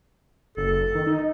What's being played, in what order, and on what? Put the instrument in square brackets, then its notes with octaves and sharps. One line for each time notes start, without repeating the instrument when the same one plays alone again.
[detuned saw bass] F#1 [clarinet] A4
[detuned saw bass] D#3
D#4